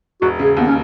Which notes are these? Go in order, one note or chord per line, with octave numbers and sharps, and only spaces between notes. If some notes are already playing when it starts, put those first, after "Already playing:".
E1 F#4
C#3
G#4
D#2 B3
C#4